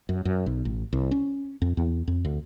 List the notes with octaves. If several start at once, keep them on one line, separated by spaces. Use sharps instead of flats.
F#2
F#2
B1
A1
C2
C#4
F2
E2
F2
D2